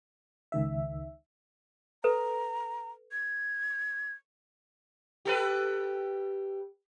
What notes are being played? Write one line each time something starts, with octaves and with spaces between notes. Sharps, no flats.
C#2 D#3 E5
A4 B4 A#5
G#6
G4 A4 B4